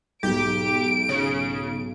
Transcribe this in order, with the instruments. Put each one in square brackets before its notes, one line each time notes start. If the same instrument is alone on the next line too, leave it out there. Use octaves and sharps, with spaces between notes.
[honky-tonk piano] B1 G#2 B2 [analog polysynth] G4 [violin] D7
[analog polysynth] C#3